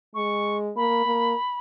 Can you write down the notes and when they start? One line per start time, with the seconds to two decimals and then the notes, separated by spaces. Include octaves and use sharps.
0.15 G#3 C#6
0.76 A#3 B5
1.06 A#3